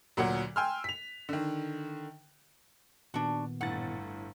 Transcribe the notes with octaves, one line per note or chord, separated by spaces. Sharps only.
D2 A#2 F#3 F#5
G5 G#5 C6 E6 F6
B6 F7
D3 D#3
A#2 D#3 B3 D4 F#4
G1 A2 F#5 A6